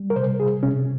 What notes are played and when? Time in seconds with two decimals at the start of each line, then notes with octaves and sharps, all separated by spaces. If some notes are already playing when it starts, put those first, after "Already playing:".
Already playing: G3
0.10 A#4
0.16 C3 C5
0.40 G#4
0.63 C3 C#4